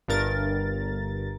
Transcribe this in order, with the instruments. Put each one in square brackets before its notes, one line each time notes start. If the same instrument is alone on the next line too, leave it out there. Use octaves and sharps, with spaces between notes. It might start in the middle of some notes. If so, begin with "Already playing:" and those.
[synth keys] G1 G2 A#4 A6